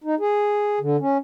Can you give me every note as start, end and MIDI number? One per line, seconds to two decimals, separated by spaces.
0.04 0.15 63
0.20 0.79 68
0.81 0.97 50
1.00 1.18 61